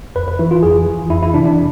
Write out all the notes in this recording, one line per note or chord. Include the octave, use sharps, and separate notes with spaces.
F2 B4
B4
E3 E4
F4
F2 G#4
E3
F2 E4
E4
C3 E3 D4
D4